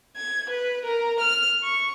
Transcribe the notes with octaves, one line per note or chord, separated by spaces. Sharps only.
G#6
B4
A#4
F6
C#6